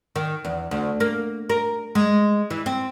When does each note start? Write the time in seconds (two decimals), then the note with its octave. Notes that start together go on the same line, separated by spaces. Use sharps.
0.16 D#3
0.45 E2
0.71 D2
1.00 A#3
1.50 A#4
1.95 G#3
2.50 E3
2.66 C4